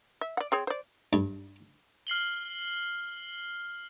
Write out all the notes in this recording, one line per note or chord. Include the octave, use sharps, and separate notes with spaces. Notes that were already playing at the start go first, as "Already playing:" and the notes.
E5
D5 F#5
C4 G#4 C#5
C5 D5
G2
F6 C7 F#7 G7